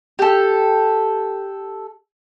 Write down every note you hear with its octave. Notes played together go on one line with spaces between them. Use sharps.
G4 A4